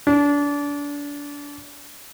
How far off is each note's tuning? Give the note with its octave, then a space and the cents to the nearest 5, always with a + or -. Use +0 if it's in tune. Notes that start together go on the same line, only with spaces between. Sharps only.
D4 -30